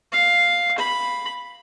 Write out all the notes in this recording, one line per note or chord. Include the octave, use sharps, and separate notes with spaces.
F5
B5